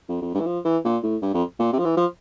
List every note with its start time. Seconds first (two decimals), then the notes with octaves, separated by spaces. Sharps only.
0.09 F2
0.22 F2
0.34 G2
0.40 E3
0.46 F3
0.65 E3
0.85 A#2
1.03 A2
1.22 G2
1.34 F2
1.60 A#2
1.73 C3
1.79 F3
1.85 E3
1.97 F3